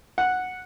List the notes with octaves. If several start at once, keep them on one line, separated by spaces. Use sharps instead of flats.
F#5